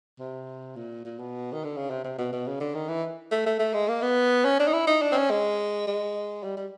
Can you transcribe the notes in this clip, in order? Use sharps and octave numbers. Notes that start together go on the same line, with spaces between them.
C3
A#2
A#2
B2
D#3
D3
C#3
C3
C3
B2
B2
C#3
D3
D#3
E3
A3
A3
A3
G#3
A#3
B3
C#4
D4
D#4
E4
D#4
D4
C4
C#4
G#3
G#3
G3
G3